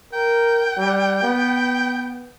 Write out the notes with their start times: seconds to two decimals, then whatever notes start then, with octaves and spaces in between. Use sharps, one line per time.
0.13 A#4 G5
0.77 G3
1.23 B3